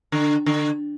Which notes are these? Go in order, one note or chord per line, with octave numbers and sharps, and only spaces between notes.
D3
D3